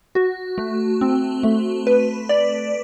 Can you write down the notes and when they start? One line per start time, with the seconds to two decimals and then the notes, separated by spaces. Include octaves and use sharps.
0.15 F#4
0.58 A3
1.01 C4
1.43 A3
1.87 B4
2.29 D5